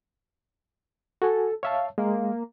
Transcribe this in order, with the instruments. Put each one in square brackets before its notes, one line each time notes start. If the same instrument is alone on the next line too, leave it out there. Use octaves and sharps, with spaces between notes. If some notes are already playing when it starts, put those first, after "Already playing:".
[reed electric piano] F#4 G#5 [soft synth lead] A4
[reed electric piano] C#5 E5 A5 [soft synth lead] F5
[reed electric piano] G#3 [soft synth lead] A#3